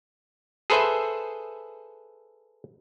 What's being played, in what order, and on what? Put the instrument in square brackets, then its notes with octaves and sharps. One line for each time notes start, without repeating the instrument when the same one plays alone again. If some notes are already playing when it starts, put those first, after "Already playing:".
[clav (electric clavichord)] G#4 A4 B4 C5 E5